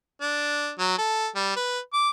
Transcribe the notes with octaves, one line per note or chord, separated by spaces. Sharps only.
D4
F#3
A4
G3
B4
D6